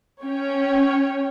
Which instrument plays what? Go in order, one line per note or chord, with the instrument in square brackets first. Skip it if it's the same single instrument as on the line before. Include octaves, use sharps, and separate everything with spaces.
[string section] C#4 C#5 G5